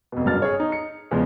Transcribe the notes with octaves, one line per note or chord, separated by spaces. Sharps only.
F1 B2
F#1 G2 F#3 F6 A6
G#4 C#5
D#4
C#7
E2 C#3 F3 G#3